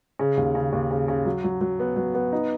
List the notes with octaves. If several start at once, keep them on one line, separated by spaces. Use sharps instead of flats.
C#3
D#2
C#3
D#2
C#3
C#3
F#3
F#3
F#3
B3
F#3
B3
D#4